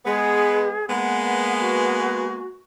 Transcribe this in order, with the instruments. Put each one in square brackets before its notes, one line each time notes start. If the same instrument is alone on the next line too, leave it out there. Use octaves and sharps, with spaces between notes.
[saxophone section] G#3 B3 [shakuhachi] G#4
[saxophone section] G#3 A#3 B3 [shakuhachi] F#5
[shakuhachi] F#4